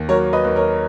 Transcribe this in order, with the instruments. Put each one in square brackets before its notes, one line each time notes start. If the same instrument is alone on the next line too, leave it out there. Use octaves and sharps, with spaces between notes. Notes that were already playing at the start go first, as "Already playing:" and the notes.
Already playing: [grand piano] D#2
F#3 A#4 C#5
B4 D#5
D#2
A#4 C#5